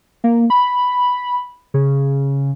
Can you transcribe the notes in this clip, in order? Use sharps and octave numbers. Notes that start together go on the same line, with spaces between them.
A#3
B5
C#3